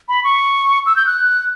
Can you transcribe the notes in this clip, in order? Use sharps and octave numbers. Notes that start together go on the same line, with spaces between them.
B5
C#6
E6
G6
F#6